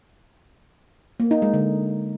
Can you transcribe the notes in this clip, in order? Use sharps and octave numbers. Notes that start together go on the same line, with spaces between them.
A#3
D#4
G#3
D3